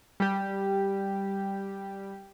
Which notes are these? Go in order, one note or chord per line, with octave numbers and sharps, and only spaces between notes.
G3 G4